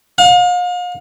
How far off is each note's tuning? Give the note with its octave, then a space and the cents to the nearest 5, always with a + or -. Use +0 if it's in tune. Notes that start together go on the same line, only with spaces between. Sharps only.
F5 +40